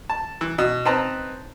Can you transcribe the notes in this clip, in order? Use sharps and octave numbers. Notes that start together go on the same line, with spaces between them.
A5
E3
B2
C4 D#4 B4 A5 A#5